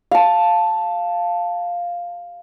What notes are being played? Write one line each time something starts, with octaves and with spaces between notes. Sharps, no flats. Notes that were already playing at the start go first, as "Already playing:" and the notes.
F5 A5